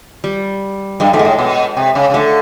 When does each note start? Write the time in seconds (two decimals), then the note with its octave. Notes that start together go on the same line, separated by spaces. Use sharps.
0.24 G3
1.00 G2 G#3
1.13 G#2 A3
1.19 G#3
1.25 A2
1.39 B2
1.77 C3
1.95 C#3
2.10 C#3
2.14 D3 A3